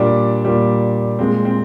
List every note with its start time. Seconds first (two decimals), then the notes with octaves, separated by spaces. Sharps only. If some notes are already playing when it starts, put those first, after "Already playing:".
Already playing: A#2 G3 D4
0.45 A#2 G3
1.19 A#2 G#3 C4
1.45 C4